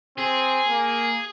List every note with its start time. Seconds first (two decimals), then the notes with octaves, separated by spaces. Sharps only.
0.18 C4 G#4
0.68 A#3